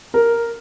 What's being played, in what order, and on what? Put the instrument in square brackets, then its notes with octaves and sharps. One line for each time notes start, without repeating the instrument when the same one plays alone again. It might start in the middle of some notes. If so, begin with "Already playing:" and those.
[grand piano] A#4